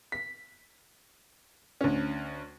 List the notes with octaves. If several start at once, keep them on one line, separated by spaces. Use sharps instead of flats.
B6
D2 C#4